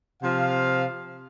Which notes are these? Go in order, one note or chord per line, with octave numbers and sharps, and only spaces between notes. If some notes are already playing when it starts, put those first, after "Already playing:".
C3 F3 F5